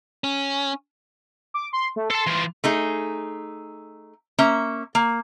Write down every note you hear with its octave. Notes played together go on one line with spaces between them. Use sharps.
C#4
D6
C6
A3
A4 A5 C6
E3 F4
A3 D#4 G#4
A#3 C#4 E5
A#3